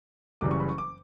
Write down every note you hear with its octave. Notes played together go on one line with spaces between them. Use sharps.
F#1 F#2 C#3 E3 G3 D6
C#6
B5
C#6
D6